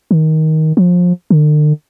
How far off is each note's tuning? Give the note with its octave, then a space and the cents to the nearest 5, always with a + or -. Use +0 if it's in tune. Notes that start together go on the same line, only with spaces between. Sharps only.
D#3 +15
F3 +25
D3 +45